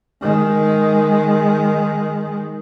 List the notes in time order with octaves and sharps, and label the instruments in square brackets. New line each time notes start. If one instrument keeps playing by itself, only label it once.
[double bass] D#3 G#3